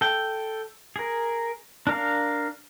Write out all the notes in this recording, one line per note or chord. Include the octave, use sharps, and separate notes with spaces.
A4 G5
G#4 A#4
D4 A#4 F5